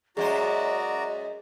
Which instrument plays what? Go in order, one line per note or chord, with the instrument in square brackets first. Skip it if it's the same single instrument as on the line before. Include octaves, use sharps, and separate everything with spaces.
[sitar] F#2 G#3 C5 [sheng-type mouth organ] F#4 D5 A#5 [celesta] G#4 [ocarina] D#5